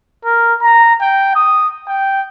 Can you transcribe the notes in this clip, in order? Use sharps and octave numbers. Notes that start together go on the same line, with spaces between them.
A#4
A#5
G5
D#6
G5